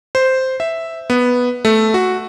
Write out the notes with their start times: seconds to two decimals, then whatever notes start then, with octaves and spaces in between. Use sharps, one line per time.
0.15 C5
0.60 E5
1.10 B3
1.65 A3
1.94 F#4